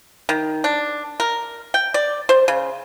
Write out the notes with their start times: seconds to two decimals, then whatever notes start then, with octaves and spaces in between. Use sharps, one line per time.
0.29 D#3
0.64 D4
1.20 A#4
1.74 G5
1.94 D5
2.29 C5
2.48 C#3